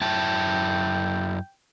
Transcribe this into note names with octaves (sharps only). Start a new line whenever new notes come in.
F#2 E4 G5 A5